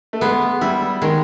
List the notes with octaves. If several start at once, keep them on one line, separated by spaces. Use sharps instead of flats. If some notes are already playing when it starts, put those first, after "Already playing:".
A3
G#3 B3
G3 E4
D#3 G#3